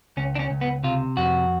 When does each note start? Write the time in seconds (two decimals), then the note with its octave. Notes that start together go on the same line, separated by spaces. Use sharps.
0.17 C#2 C#4
0.35 D4
0.39 C#4
0.51 C#2
0.61 B3
0.84 C3 F4
1.17 F2 F#4